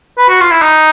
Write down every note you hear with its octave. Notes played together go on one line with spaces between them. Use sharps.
B4
F#4
F4
E4
D#4